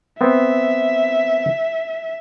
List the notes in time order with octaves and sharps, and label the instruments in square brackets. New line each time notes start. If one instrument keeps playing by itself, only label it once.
[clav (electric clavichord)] B3 C4 [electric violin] E5